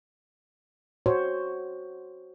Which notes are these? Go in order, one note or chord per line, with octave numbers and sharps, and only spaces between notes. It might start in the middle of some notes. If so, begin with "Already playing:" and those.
F#4 C5 C#5